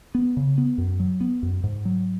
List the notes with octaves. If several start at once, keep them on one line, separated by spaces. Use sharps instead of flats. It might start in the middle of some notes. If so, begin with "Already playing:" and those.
B3
C#3
B3
F#2
F#3
B3
F#2
G#2
F#3